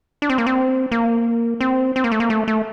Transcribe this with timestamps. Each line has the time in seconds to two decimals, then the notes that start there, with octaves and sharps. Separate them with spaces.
0.22 D4
0.30 C4
0.38 A#3
0.46 C4
0.92 A#3
1.61 C4
1.96 C4
2.04 A#3
2.12 A3
2.20 A#3
2.30 A3
2.48 A3